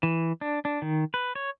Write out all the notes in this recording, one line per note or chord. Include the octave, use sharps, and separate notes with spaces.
E3
D4
D4
D#3
B4
C#5